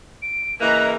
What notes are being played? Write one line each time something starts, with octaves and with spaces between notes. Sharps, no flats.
D7
C#3 E3 A#3 B4 D#5 A#5 F#6